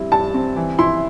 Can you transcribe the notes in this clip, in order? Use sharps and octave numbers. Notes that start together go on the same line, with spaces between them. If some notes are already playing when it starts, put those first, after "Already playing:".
Already playing: G2 G3 C4 E4
G2 A5
C4
E3
E4 C6